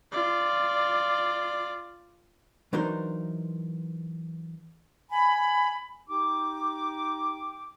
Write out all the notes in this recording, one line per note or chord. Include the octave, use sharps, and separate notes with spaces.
F4 D5
E3 F#3 D4 D#4 A#4 C5
G#5 B5
D#4 G4 G5 D6